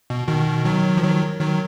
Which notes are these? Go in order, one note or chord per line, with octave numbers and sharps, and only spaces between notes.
B2
B2 D#3
D#3 F#3
F3
D#3 F#3
D#3 F#3